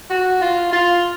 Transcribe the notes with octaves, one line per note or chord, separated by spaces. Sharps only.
F#4
F4
F4